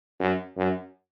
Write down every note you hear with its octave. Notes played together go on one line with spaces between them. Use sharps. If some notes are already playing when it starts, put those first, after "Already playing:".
F#2
F#2